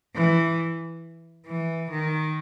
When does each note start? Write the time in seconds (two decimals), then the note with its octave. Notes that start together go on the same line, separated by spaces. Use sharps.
0.15 E3
1.47 E3
1.91 D#3